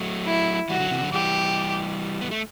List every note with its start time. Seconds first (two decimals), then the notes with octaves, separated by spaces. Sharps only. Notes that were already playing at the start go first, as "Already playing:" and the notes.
Already playing: F#3 A3
0.26 E4
0.69 E3 G3 F#4
0.80 D3 F#3
0.91 C3 E3
1.01 D3 F#3
1.12 E3 G3 G4
2.21 B3
2.31 A3